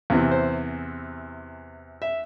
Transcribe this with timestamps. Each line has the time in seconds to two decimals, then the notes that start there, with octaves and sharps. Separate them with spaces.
0.10 E2 C3 E3
0.31 C5
2.02 E5